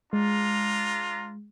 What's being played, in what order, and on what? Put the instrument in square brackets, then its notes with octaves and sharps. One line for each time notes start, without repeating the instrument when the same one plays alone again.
[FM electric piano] G#3 [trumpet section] D4 F4 A#5